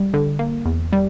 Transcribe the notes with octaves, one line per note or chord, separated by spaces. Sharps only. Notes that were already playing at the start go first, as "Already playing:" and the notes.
Already playing: G3
D3
A#3
E2
G3